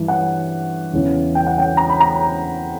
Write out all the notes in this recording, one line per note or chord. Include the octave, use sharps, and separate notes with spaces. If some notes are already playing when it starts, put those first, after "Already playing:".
Already playing: G2 E3
F#5
E2 C#3 E3
G5
F#5
G5
A#5
B5
A#5